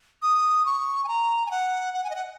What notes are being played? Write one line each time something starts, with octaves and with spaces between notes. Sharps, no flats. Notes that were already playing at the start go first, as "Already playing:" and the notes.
D#6
C#6
G#5
A#5
G#5
F#5
F#5
G#5
D#5
F#5